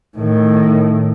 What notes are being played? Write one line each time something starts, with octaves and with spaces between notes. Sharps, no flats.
A2 D#3